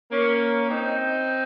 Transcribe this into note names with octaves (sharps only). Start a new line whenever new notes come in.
A#3 C#4
C4 D#4